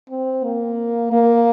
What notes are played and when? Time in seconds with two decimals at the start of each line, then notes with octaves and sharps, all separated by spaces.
0.10 C4
0.44 A#3
1.12 A#3